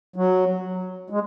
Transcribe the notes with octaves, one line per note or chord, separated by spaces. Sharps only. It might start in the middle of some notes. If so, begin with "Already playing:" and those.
F#3
G#3